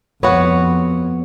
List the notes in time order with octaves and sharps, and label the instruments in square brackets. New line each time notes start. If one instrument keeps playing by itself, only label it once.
[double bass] F2 [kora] B3 F#4 [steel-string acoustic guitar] C#5 F#5